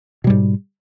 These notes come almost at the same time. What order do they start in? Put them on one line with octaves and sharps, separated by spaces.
B2 G3 G#2